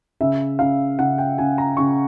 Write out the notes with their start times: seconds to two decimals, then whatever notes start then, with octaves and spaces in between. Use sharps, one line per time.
0.21 C#3 E5
0.59 C#3 F5
0.99 C#3 F#5
1.18 G5
1.38 C#3 G#5
1.58 A#5
1.77 C#3 C#6